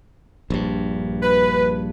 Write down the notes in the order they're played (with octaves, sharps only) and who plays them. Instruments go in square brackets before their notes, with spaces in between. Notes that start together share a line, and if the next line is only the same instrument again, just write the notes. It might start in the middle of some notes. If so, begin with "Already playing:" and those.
[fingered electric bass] A#1 G2
[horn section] B4